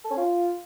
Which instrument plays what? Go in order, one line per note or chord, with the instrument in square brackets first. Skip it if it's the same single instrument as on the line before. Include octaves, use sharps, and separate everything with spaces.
[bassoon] A4
C#4
F4